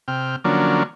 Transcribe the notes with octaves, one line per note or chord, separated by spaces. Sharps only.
C3 G5 F6
D3 F3 F#3 A#3 C#4 D4